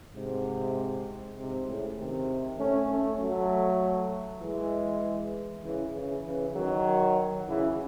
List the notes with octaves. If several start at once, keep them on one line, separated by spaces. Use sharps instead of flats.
G#2 C3
G#2 C3
A2 C#3
C3 D#3
A3 C#4
A3 C#4
F#3 A3
E3 G#3
C#3 E3
C#3 E3
C#3 E3
D#3 F#3
C#3 E3